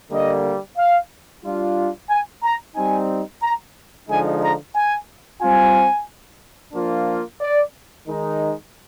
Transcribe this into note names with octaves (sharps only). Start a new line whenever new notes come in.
D3 G3 A#3 D#5
F5
G3 D4 F4
G#5
A#5
G3 C4 D#4 G#5
A#5
D3 F3 G#3 D#4 G#5
A#5
G#5
G3 C4 F4 G#5
F3 A#3 D4 F4
D5
D#3 G#3 D#4